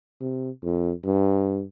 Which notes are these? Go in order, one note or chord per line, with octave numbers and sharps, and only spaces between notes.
C3
F2
G2